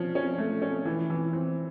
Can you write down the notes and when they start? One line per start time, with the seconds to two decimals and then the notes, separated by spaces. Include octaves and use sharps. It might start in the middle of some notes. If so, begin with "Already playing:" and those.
Already playing: F3 C#4
0.15 C#4
0.38 A3
0.62 C#4
0.85 E3
1.10 E3
1.33 C4